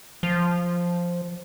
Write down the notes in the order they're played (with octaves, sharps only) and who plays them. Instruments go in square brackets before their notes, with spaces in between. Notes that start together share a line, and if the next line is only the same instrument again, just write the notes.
[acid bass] F3